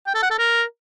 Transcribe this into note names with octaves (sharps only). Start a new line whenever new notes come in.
G5
A4
F#5
A4
A#4